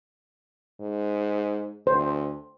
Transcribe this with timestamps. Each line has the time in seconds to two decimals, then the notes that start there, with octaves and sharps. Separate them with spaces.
0.80 G#2
1.87 D2 C5